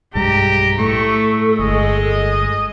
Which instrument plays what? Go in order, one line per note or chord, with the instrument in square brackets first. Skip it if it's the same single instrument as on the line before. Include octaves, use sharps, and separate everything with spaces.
[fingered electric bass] B1 G2 G#3 [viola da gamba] G4 [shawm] A#5
[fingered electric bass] A2 [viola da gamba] A3 [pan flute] A4 [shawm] C#6
[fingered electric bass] G1 [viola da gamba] G#3 [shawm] D#5